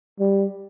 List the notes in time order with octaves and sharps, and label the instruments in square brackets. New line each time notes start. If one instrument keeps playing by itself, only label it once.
[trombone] G3